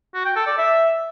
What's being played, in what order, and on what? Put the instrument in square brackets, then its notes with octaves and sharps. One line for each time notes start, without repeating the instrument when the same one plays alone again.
[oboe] F#4
G5
A4
D5
E5